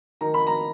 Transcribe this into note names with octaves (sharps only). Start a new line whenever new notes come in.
D#3 A#5
B5
A#5